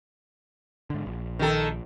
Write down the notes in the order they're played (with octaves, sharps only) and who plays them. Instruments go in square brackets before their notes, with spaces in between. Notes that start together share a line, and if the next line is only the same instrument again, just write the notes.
[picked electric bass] G#2 D3
A#1
[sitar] D#3 A4